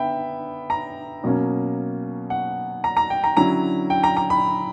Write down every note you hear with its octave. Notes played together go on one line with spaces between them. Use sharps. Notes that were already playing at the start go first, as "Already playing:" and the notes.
Already playing: D3 B3 E5 G5 B5
A#5
B2 F#3 A#3 C#4
F#5
A#5
A#5
G5
A#5
D3 F#3 C#4 E4 A#5
G5
A#5
A#5
B5